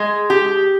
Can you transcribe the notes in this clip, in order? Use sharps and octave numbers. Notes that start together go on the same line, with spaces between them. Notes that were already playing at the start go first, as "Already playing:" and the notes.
Already playing: G#3
G4